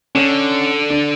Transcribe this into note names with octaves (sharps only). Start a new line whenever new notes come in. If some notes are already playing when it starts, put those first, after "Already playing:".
D3 C#4
D4